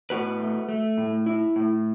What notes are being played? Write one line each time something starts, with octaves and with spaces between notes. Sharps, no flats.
A2 F#4 B4
A3
A3
A2
E4
A2